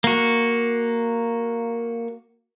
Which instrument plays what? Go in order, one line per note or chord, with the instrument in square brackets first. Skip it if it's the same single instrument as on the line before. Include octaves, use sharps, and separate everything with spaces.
[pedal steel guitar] A#3 F#4